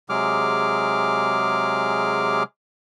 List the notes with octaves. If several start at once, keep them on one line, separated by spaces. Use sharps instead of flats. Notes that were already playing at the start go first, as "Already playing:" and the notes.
C3 F#3 G#3 G#4 D6 F6